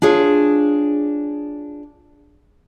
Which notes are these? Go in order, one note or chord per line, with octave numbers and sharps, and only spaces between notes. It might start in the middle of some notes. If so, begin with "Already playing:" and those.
D4 F4 G#4 C#5